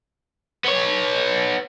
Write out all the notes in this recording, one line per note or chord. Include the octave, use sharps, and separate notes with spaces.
B3 C#5